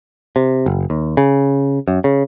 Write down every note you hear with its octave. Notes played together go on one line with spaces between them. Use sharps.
C3
F#1
D#2
C#3
F#2
C#3